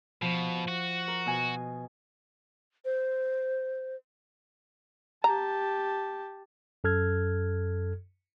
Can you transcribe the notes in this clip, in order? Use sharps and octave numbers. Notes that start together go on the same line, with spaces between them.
B2 F3
F#4
A#4
B2 D#5 G#5
C5
G4 A5 A#5
F#2 A4 F6 G#6